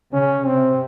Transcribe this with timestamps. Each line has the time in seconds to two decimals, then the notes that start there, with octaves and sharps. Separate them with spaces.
0.13 C#3 C#4
0.46 C3 C4